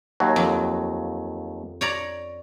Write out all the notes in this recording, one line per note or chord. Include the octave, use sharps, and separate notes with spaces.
D#2 F#3
F2
C#5 D5 A#5